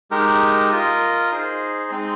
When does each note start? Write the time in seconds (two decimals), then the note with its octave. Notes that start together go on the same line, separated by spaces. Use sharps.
0.11 G#3 D#4 G4 A#4
0.71 F4 A#4 D#5
1.31 D#4 G#4 C5 D#5
1.91 G#3 C4 D#4